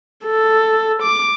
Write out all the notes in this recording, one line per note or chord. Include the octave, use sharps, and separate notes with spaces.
A4
D6